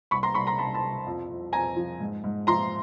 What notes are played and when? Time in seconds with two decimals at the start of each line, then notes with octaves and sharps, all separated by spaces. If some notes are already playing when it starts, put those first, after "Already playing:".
0.11 C2 B5 C#6
0.23 A#5 C6
0.34 C2 B5 C#6
0.47 A#5 C6
0.58 C2 A5 B5
0.74 A5 B5
0.82 C2
1.06 F2
1.30 F2
1.53 F2 G#5 A#5
1.76 F3
2.00 G#2
2.24 G#2
2.47 F3 A#5 C6